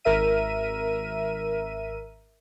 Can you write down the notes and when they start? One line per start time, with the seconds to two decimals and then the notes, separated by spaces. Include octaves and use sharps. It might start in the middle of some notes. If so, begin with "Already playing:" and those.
0.05 G#1 A#4 E5 D#7